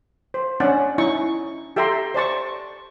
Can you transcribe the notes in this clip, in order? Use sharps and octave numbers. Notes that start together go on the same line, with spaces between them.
C5
C#4 D4 F#5 A5
C#4 D#4 E4 C#6
G4 A4 E5 G5 A#5 C6
C5 D5 A5 C#6